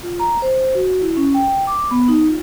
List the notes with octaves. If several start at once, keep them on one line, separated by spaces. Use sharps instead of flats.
F4
A#5
C5
F#4
E4
C#4
G5
D6
B3
D#4
F4